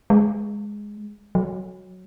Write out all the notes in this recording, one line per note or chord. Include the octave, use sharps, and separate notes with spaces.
G#3
F#3